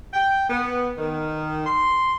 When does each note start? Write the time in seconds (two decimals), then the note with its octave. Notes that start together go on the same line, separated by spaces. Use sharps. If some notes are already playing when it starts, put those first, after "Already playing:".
0.14 G5
0.49 B3
0.97 D#3
1.66 C6